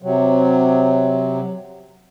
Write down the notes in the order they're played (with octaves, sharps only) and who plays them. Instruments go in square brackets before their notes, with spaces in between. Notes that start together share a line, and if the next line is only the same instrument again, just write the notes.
[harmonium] C3 F#3